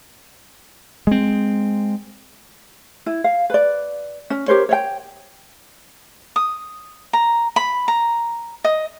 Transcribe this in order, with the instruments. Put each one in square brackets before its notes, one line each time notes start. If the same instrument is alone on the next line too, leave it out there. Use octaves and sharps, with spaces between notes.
[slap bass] G#3 C4
[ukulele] E4
F5
B4 D5
C#4
G4 A#4 C5 C#5
C#5 D5 G5
[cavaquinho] D#6
A#5
B5
A#5
D#5